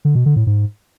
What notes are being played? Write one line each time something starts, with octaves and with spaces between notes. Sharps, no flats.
D3
B2
D3
A2
G#2